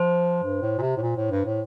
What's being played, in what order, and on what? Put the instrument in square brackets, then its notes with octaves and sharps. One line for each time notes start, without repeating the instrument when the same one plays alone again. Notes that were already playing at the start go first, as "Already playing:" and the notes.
Already playing: [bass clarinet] F3 [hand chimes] C5
[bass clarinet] G2
A2
A#2
C3
A2
A#2
A2
G2
A2